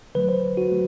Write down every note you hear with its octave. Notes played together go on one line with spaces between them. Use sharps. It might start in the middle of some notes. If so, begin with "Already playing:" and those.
D3 F#3 A3 B4
C5
F#4
F#3 A3